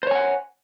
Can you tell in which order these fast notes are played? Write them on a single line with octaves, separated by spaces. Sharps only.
C5 C#5 G#5 F#5